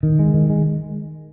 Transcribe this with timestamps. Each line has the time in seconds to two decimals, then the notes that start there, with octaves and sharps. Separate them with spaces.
0.03 D#3
0.19 G#3
0.34 D#3
0.50 G#3